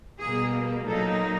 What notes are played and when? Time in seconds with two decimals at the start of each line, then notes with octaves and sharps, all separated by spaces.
0.19 B2 G3 A#3 G#4
0.87 A#2 F#3 A#3 D#4 A4